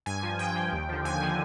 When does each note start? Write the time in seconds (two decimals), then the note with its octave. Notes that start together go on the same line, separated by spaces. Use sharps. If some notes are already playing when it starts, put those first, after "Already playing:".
0.06 G2 G#5
0.23 F3
0.39 G2 G5
0.55 F3
0.72 D#2
0.89 D3 F3
1.04 D#2 G#5
1.21 D3 F3